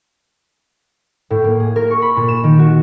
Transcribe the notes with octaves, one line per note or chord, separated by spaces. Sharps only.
A2
A#3
G#4
A#4
C#6
B5
A#2
E7
D#3
F#4